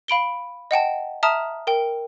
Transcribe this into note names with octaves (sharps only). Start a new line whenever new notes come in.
F5 B5 D7 G7
D#5 F#5 G5 A5
E5 A5 A#5 D#6 F6
A#4 G5